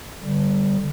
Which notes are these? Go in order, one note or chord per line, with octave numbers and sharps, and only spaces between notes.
D3 G3